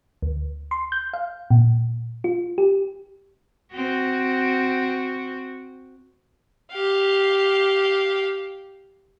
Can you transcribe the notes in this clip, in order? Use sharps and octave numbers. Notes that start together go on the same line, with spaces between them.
D2
C6
G6
F5
A#2
F4
G4
C4 F#4
G4 F5